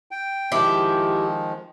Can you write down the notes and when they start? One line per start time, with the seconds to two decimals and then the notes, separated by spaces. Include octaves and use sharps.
0.11 G5
0.52 D#3 F3 G#3 E4 G4